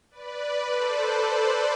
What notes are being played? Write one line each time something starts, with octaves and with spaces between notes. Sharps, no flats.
B4 D5
A4 C5